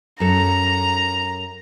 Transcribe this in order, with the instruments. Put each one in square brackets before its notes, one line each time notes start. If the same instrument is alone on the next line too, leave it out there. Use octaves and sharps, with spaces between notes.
[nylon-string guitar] F#2 A4 [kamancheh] A#5